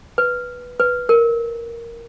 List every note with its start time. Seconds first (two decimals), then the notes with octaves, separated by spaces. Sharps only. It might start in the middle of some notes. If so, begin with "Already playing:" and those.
0.18 B4
0.79 B4
1.09 A#4